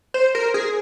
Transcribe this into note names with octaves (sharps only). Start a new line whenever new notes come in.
C5
A#4
G#4